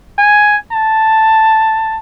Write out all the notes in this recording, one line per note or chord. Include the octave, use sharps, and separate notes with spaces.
G#5
A5